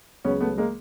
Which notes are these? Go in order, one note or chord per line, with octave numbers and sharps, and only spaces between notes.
C#2 C#3 F#3 B3 C#4
A3 B3
G#3 A#3